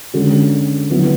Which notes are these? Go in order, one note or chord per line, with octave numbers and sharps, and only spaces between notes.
D3 G#3 C#4 F#4
D3 F#3 B3 E4